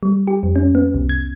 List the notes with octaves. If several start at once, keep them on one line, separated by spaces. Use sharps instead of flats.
G3
G4
F2
C#4
B3
C2
G#6